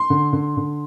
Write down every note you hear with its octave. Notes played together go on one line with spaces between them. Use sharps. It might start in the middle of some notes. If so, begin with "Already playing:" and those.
Already playing: C6
D3
D3
D3